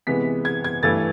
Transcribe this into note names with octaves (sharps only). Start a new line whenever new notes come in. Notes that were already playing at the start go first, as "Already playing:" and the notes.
C3 E3 G#3 B3 B6
G#6
G#6
G2 E3 A3 A6